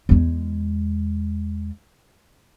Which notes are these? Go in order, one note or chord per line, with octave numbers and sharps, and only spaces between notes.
E2 G#3